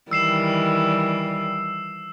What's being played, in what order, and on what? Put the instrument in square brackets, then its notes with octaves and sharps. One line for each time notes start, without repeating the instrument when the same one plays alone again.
[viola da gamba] D#3 E3 G3 [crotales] E6 C7 E7